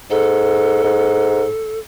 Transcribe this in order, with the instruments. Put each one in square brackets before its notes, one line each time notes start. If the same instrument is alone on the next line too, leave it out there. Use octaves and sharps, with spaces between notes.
[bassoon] G#2 [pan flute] A4
[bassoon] G#2